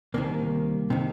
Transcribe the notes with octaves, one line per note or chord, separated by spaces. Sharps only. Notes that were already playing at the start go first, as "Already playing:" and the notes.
C2 C3 D#3 A#3
C3 D#3